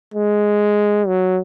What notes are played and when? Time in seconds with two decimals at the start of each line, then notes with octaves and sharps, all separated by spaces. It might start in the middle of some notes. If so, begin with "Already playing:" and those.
0.14 G#3
1.07 F#3